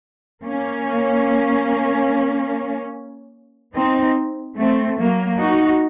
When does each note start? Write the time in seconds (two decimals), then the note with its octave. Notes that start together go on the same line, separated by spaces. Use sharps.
0.43 A#3 C#4
3.74 C4 D#4
4.57 A3 C4
4.99 F#3 A#3
5.40 D#4 F#4